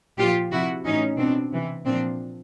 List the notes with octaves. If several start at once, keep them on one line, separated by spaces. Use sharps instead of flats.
A#2 F3 F4 G4
C3 F3 E4 F#4
A2 E3 C#4 D#4
B2 C4 D4
C3 E3
A#2 F3 C4 D4